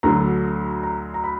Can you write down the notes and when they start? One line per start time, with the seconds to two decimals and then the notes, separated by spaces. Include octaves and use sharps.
0.03 D2 D3 F#3 A#5
0.83 A#5
1.14 A#5
1.24 B5